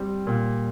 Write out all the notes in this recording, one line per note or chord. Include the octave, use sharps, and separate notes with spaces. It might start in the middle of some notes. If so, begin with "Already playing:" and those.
Already playing: G3 C4
A#2